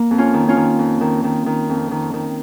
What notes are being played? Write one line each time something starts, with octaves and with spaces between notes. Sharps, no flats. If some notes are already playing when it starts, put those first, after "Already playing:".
Already playing: A#3
F2
C#4 F4
D#3
C#4 F4
D#3
F2
D#3
D#3
D#3
F2
D#3
D#3